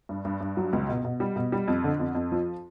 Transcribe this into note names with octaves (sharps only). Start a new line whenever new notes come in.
G2
G2
G2
F#3
C#2
B2
B2
G3
B2
G3
F2
D3
F2
F2
F3